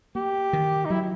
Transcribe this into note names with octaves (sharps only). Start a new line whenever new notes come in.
A#3 G4
D#3
D#4
F#3 E4